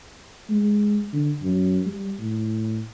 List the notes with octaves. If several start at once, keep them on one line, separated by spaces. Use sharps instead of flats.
G#3
D3
F#2
G3
A2